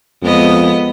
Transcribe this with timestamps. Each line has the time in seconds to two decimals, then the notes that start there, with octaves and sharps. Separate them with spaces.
0.22 F2 G#3 B3 D#5